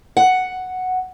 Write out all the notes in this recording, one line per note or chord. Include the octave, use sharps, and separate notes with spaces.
F#5